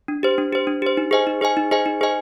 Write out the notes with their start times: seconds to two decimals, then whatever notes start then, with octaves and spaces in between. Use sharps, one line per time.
0.08 D4
0.23 G4 C5
0.38 D4
0.53 G4 C5
0.67 D4
0.82 G4 C5
0.97 D#4
1.11 G#4 C5 D#5 G#5
1.27 D#4
1.41 G#4 C5 D#5 G#5
1.57 D#4
1.71 G#4 C5 D#5 G#5
1.86 D#4
2.01 G#4 C5 D#5 G#5